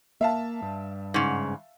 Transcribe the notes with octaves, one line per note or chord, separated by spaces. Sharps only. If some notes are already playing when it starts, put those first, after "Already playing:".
A#3 E5 F5 A5
G2
G#2 C#3